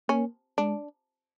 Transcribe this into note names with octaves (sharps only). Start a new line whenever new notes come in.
A#3 C#4
G#3 D4